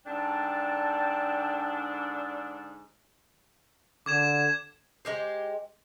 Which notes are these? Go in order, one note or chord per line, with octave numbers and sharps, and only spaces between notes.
G#2 D3 D4 G5 A5
D3 D6 G#6 E7
G#3 G4 C5